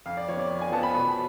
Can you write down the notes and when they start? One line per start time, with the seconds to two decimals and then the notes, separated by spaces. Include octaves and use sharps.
0.06 F2 F5
0.17 D5
0.28 F3 B3 C#5
0.39 D5
0.50 F2
0.61 G#5
0.72 F3 B3 A5
0.83 B5
0.94 B2 B5